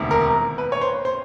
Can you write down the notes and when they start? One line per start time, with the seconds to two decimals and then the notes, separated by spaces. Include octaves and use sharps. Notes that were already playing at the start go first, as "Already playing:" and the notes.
Already playing: E1 D2 C3 D#3
0.11 A#4
0.58 B4
0.72 C#5
0.81 C5
1.05 C5